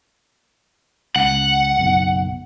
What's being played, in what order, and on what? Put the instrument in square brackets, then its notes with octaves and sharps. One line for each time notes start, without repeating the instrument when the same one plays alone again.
[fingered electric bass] C#2 [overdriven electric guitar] F#5
[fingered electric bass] F#1 B1